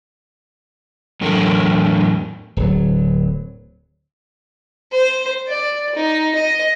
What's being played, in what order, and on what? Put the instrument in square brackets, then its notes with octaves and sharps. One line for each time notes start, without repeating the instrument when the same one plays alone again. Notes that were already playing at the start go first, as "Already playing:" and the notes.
[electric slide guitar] E2 A2 D3 F#3 A4 A#4
[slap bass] D1 F#3
[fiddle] C5
D5
D#4
D#5